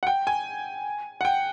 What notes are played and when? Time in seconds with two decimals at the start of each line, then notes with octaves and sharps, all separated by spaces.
0.03 F#5
0.07 G5
0.27 G#5
1.21 F#5
1.25 G5